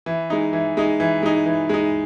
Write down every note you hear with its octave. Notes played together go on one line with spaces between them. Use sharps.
E3
G#3 D#4
E3
G#3 D#4
E3
G#3 D#4
E3
G#3 D#4